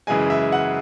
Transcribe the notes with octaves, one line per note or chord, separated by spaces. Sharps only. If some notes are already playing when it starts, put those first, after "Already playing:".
F#2 C#3 E3 G#3 G#5
E5
F#5